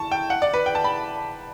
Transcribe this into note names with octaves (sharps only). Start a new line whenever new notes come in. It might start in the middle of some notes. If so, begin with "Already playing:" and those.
Already playing: A5 C#6
G5
F#5
D5
B4
G5
A5
B5